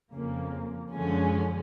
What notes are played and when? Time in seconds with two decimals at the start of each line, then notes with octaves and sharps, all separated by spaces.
0.13 F2 C#3 F3 A#3
0.93 F#2 D3 F3 G#3 C#4